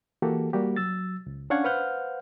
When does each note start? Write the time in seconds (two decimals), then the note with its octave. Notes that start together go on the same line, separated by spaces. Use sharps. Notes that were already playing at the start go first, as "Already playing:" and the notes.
0.22 E3 A#3 F#4 G4 A4
0.53 G3 A#3 F#4 G4
0.76 F#3 E6 A6
1.26 C#2
1.50 C#4 D4 F5 F#5 C#6 G#6
1.64 B4 C5 F5 F#5 F6 G6